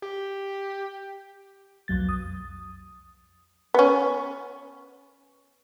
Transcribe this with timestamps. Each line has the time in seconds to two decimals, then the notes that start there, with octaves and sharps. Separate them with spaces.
0.02 G4
1.88 B1 F2 F#3 A6
2.09 D#6
3.74 B3 C#4